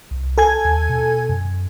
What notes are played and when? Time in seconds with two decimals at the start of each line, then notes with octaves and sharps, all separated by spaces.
0.11 C2
0.38 A4 G#5 G#6
0.65 D#2
0.89 B2
1.29 F#2